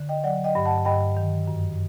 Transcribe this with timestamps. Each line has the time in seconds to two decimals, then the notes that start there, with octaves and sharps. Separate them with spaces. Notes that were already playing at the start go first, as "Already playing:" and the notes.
Already playing: D3
0.09 D#5 G5
0.23 F#3 D5 F#5
0.44 D#5 G5
0.55 G2
0.65 F#5 A5
0.85 G2 D#5 G5
1.17 D#3
1.47 F#2